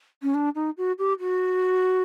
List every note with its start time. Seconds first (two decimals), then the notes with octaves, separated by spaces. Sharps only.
0.23 C#4
0.34 D4
0.55 D#4
0.77 F#4
0.99 G4
1.20 F#4